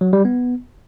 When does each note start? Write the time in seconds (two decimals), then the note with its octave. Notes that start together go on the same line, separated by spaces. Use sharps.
0.01 F#3
0.13 G3
0.25 B3